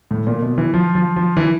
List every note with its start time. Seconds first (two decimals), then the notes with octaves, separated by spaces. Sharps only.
0.11 A2
0.27 A#2
0.42 B2
0.58 E3
0.74 F3
0.95 F3
1.16 F3
1.37 E3